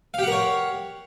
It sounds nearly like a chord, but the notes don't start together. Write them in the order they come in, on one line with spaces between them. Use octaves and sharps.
F5 G4 F#5 A#4 C#5